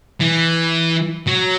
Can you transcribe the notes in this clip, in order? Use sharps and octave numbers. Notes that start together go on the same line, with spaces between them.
E3
F#3